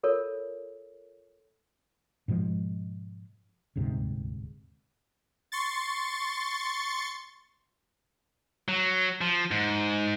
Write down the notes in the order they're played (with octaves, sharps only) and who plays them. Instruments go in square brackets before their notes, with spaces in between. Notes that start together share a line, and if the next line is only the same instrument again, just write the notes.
[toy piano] F4 A4 A#4 C#5
[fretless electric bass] G#2 B2 F3 G#3
D#1 D2 G#2 C3
[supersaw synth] C6 C#6 A6
[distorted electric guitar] F#3
F3
G#2